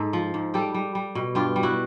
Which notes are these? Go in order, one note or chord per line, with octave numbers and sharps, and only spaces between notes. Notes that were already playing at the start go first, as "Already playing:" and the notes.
Already playing: G#2 A4
F3
G#2
G3 G4 A4
G3
G3
B2
G2 F4 G4
G3
E4 F#4